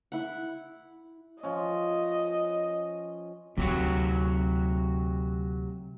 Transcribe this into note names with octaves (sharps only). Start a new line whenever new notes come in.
E4 F#5
F3 C#4 D#5
D2 C3 F#3 F#4